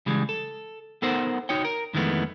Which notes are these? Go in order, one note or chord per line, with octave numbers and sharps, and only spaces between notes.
C#3 E3 G3 G#3
A4
B3 D#4 A4 A#4 C5 F#5
D#4 F#4 C#5 G5
A#4
F2 D#3 E3 G#3 A3 B3